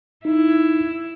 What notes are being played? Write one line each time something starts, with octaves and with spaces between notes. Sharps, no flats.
D#4 E4